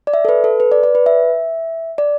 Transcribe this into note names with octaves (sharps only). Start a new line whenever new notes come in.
D5
E5
A4
B4
A4
B4
D5
D5
B4
E5
D5